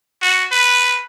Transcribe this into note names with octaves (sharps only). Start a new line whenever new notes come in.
F#4
B4